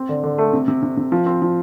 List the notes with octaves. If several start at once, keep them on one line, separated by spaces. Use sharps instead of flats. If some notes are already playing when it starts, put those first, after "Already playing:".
Already playing: C4
D3
D3
A3
C3
C3
C3
C3
F3
C4
F3